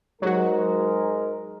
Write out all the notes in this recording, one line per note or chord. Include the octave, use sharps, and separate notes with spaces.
G#2 F#3 G#3 F#4 A#4